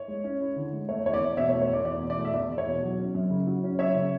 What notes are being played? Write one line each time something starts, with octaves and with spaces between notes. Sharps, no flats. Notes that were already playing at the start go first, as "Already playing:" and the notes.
Already playing: C#5
G#3
C#4
E4
D3
G#3
A3 C#5
E2 C#5
D5
E2
B2 C#5 E5
C#5
A3
C#5
E2 D5
E2 D5
B2
D5
A3
E5
E2 D5
E2
C#5
B2
F#3
C#4
F#2
C#3
F#3
C#4
F#2 C#5 E5
C#3